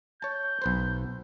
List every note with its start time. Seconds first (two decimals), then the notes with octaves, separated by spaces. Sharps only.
0.22 C#5 A5 G6
0.62 B1 B4 C5